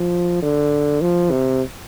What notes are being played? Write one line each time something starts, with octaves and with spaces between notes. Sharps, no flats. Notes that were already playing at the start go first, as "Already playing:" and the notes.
Already playing: F3
D3
F3
C3